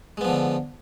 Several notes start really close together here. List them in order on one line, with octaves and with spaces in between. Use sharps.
G#3 B3 F3 D3